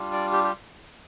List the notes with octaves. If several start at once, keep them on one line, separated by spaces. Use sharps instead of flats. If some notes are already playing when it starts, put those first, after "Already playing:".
Already playing: G3 D4 F4
D5
G4
G4